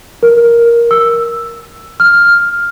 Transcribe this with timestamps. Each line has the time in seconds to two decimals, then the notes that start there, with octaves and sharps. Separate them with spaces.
0.23 A#4
0.91 E6
2.00 F6